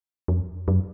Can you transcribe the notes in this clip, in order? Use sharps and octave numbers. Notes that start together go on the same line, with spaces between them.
F2
F#2